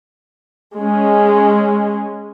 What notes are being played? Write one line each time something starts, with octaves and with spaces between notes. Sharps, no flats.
G#3 C#4